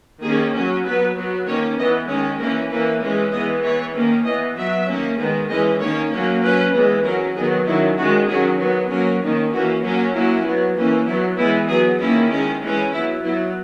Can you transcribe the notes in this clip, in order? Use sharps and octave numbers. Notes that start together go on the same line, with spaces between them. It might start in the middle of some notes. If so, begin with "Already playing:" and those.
D#3 A#3 C#4 G#4
F#3 C#4
F#3 B3 B4
F#3 B3
D#3 A#3 C#4 C#5
E3 B3 D#5
D#3 G#3 C#4 C#5
E3 A#3 C#4 A#4
E3 A#3 C#4 B4
E3 G#3 C#4
E3 G#3 B3 D#5
E3 B3 C#5
D#3 A#3 C#4
E3 B3 D#5
F#3 B3 E5
D#3 A#3 C#4
D#3 G#3 B3
E3 G#3 C#4 D#5
D#3 A#3 C#4 C#5
F#3 A#3 C#4
F#3 C#4 B4
E3 G#3 B3
F#3 C#4 A#4
D#3 F#3 B3 G#4
D#3 F#3 C#4 E4
D#3 G#3 C#4 F#4
D#3 F#3 C#4 G#4
F#3 B3 B4
F#3 A#3 C#4 A#4
D#3 A#3 C#4
E3 A#3 C#4 F#4
F#3 A#3 C#4
F#3 A#3 C#4 E4
F#3 B3
E3 A#3 C#4
F#3 B3 E4
E3 G#3 B3 E4
F#3 B3 G#4
D#3 A#3 C#4 E4
D#3 G#3 C#4
E3 G#3 C#4
F#3 B3 E4
F#3 B3 E4